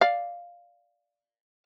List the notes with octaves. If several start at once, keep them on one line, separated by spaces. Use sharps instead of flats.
D5 F5